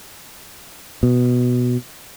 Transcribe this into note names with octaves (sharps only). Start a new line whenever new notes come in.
B2